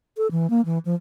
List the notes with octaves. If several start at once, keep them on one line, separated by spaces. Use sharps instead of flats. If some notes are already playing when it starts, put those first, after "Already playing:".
A4
E3
A#3
E3
F3